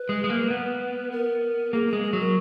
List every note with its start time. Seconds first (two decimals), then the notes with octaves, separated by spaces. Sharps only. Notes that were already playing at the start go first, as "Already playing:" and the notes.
Already playing: B4
0.09 G#3
0.24 G#3
0.29 A#3
0.51 B3
1.12 A#4
1.73 A#3 G#4
1.88 G#4
1.93 G#3
2.03 G#4
2.13 F#3
2.19 A#4